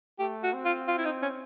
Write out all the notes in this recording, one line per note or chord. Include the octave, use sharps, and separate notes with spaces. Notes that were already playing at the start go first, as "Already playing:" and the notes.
A3 G4
F#4
C4
F4
F4
E4
D#4
C#4